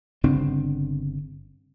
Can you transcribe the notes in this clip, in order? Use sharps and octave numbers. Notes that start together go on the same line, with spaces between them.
G1 C#3 C4 D4